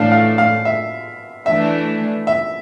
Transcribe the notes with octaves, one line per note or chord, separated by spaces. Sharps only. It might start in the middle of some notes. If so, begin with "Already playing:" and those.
Already playing: A2 E3 A3 D4 F5
F5
F5
E5
E3 A3 D4 E5
E5